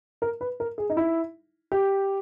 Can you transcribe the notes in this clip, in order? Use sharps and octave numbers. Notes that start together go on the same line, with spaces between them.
A#4
B4
A#4
G#4
D#4
E4
G4